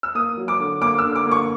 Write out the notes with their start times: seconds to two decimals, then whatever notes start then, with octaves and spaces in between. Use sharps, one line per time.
0.03 E6
0.15 A#3 D#6
0.37 F#3
0.48 D6
0.60 D3
0.82 A#3 D6
0.99 E6
1.04 D3
1.15 D6
1.26 A#3
1.31 C#6